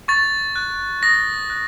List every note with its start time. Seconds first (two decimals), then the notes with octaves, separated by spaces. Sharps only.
0.08 C#6 A6
0.56 F#6
1.03 D#6 A#6
1.50 F#6